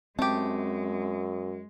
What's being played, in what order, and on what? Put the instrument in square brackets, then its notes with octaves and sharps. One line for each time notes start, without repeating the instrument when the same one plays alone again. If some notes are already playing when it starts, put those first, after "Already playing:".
[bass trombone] F#2 [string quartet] G#3 [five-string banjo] A3 G4 [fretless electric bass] C4